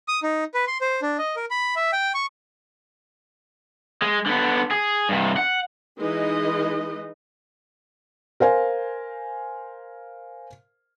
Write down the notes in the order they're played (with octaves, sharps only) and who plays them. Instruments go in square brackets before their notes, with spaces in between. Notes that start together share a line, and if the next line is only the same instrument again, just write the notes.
[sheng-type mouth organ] D#6
D#4
B4
C6
C5
D4
D#5
A#4
B5
E5
G5
C#6
[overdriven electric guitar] G#3
D3 B3
G#4
G2 C3
F#5
[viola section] E3 G#3 D#4 B4 D#5
[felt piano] A#4 C5 F5 G#5